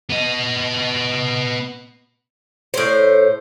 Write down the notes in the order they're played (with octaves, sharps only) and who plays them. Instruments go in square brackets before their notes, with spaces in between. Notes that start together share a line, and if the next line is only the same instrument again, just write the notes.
[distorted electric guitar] B3 D#5
[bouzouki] A2 C5